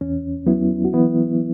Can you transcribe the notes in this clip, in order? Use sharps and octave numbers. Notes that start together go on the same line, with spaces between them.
E2 C#4
F#3 B3 E4
F#4
E3 B3 E4